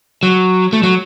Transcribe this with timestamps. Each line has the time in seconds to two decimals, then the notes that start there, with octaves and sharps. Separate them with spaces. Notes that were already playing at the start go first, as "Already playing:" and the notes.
0.23 F#3
0.73 A3
0.83 F#3